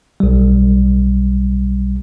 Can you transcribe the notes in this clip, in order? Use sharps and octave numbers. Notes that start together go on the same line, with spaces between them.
B1 G3